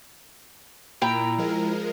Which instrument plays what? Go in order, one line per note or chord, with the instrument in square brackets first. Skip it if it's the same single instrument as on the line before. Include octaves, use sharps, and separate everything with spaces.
[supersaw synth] A#2 [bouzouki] E4 G5 A#5
[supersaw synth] F3 G#3 A#4